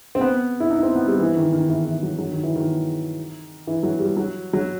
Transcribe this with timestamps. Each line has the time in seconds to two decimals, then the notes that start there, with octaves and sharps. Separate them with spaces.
0.15 C4
0.21 B3
0.60 E4
0.71 D#4
0.83 C4
0.95 B3
1.08 G3
1.19 E3
1.36 D#3
1.53 D#3
1.69 E3
1.85 E3
2.03 F#3
2.18 F#3
2.31 D#3
2.43 E3
2.56 D#3
3.67 E3
3.83 F#3
3.99 G3
4.17 F#3
4.53 F#3